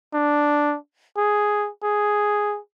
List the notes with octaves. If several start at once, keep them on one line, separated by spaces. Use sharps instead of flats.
D4
G#4
G#4